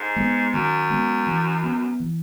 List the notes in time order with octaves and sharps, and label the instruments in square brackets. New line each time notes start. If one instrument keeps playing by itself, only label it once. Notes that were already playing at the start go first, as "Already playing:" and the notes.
Already playing: [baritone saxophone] G#2
[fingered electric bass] G#3 B3
[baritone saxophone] F#2 [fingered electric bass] D#3
[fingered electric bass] G#3 B3
E3
B3
E3